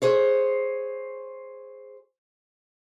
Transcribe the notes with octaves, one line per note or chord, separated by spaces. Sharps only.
G#4 C5 C#5